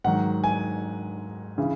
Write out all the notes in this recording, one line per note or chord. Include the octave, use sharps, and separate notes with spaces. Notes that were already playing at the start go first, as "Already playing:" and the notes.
G#2 D#3 F#3 F#5
G#5
C#3 E3